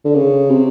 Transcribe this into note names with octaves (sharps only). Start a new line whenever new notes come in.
D3
C#3
C3